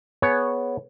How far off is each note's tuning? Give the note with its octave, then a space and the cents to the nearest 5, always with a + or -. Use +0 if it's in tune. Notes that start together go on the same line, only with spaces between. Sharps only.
B3 +0 G#4 +20 C#5 +0